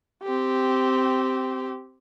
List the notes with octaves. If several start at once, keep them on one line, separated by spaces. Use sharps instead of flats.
C4 G4